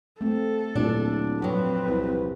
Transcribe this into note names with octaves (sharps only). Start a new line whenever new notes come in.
A3 C4 A4
D1 A#2 D4
F2 F#3 C4 B4
C2